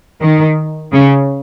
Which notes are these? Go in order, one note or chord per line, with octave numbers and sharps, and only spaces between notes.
D#3
C#3